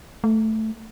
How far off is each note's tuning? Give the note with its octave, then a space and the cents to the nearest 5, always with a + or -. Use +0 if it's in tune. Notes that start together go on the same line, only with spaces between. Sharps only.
A3 +0